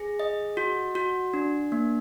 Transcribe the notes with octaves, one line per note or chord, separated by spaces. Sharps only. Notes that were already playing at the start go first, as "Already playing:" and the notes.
Already playing: G#4
D#5
F#4
F#4
D4
A#3